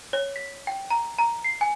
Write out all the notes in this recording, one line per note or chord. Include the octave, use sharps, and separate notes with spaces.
C#5
B6
G5
A#5
A#5
C7
G#5